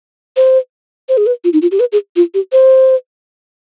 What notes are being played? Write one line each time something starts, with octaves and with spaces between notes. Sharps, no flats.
C5
C5
G#4
B4
F4
D#4
F4
G4
B4
G#4
F4
G4
C5